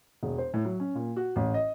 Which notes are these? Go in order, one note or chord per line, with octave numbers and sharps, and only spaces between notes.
E1
C5
A2
F#3
C#4
A#2
F#4
A1
D#5